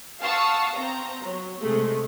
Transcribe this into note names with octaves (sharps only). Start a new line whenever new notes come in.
F5 F#5 A5 C#6 D#6 E6
C4 A#5
F#3
C3 G#3 A3